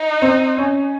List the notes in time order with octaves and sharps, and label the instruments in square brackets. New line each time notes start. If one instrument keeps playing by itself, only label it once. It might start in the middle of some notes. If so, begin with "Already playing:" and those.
Already playing: [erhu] D#4
[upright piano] C4
C#4